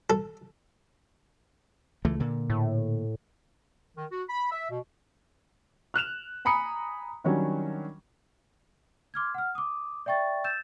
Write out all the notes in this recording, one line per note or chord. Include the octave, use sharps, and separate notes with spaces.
A4
C#2 E3 A3
A#2 D3
A2
D#3
F#4
B5
E5
B2
F6 F#6 E7 F7
G#5 A#5 B5 D#6 C#7
D#3 F#3 G3 C#4 D4
C6 D6 F6 G#6
F#5 F6
D6 D#6
D5 E5 G5 C#6 A6
E6 G6 A6 E7